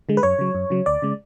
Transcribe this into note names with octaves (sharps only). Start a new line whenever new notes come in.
D3 G#3
B4
F#2 C#5
C#3 F#3
F#2
C#3 F#3
D2 D5
C#3 G#3